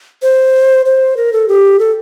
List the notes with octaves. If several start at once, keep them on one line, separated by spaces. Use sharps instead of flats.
C5
C5
A#4
A4
G4
A4